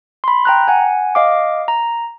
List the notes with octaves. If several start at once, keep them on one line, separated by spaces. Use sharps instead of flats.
B5 C6
G5 A#5 F#6
F#5 G#5
D#5 F5 D6
A#5